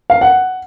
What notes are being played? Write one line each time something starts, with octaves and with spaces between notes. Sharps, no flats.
F5
F#5